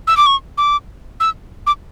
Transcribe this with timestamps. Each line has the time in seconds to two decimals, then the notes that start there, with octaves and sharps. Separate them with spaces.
0.07 E6
0.17 D6
0.26 C#6
0.58 D6
1.20 E6
1.67 D6